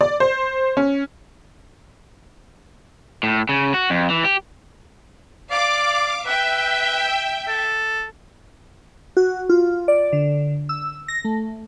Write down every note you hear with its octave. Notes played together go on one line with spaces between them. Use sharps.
D5
C5
C#4
A2
C#3
F#4
F2
E3
G4
D5 F5 D6
B4 E5 G5
A4
F#4
F4
D5
D3
E6
A#6
A3